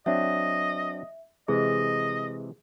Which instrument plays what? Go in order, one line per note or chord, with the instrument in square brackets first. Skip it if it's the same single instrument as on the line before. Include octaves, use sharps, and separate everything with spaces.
[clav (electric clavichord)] F#3 C4 D4 [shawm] D#5 [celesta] E5
[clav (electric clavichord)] C3 E3 G#3 [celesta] G#4 [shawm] D#5